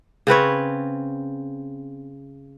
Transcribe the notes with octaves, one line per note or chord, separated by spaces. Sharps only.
C#3 C4 B4 C#5